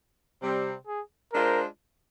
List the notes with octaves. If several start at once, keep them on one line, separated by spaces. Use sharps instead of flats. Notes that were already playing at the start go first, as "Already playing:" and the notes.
C3 G3 C4
G#4
G#3 D4 F4 A#4 C5